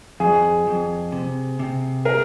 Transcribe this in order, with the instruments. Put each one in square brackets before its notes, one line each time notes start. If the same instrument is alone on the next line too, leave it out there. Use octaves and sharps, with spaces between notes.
[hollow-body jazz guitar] F2 [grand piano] G#4
[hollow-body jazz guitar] F2
C3
C3
[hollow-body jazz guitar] G#4 [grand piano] A#4